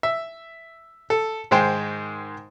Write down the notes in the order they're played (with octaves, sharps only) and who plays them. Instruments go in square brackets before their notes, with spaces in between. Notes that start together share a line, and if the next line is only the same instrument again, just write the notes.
[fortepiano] E5
A4
G#2 D#3 G#3 C5 G5